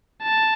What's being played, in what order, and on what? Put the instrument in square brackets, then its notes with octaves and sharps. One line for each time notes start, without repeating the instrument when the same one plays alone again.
[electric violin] A5